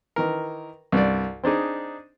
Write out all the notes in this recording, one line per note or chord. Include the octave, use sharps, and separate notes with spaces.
D#3 E3 A#4
C2 G2 D5
C4 D4 D#4 G#4